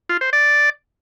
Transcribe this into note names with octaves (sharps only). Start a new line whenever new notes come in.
F4
C5
D5